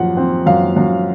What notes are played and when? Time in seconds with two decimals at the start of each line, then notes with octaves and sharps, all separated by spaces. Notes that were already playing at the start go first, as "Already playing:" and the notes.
Already playing: F#2 F3 F#5
0.17 C4
0.46 F#2 F5
0.76 F#2